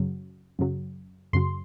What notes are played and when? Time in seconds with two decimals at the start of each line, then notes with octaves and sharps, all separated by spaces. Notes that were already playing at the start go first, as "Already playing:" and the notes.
Already playing: F#2 C#3 F#3
0.59 F#2 C#3 F#3
1.33 F#2 C#3 F#3 C6